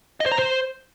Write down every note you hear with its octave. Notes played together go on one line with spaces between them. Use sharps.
D#5
C5
A#5
C5